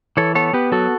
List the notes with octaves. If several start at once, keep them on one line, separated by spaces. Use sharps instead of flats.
E3 A4 C#5
B3 A4 C#5
B3 G4 B4
F#3 F#4 A4